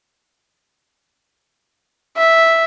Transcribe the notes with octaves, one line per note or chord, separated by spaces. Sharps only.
E5